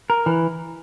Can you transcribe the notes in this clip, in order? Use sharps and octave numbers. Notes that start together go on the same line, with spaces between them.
A#4
E3